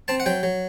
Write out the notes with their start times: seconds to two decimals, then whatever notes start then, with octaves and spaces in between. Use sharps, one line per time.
0.08 C4 A5
0.20 F#5
0.26 F#3 G5
0.43 F#3